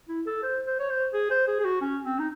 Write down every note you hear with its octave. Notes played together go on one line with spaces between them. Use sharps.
E4
A4
C5
C5
C#5
C5
G#4
C5
G#4
G#4
F#4
C#4
C4
D#4